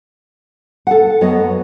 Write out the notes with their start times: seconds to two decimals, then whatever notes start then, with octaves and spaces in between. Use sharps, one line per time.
0.87 A4 F#5
1.21 F#2 F#3 B3 D#5